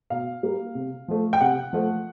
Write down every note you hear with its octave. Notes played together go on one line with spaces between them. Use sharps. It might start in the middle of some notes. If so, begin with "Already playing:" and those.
B2 F5
G3 A#3
C3
F3 A3
G5
C3 F#5
F3 A3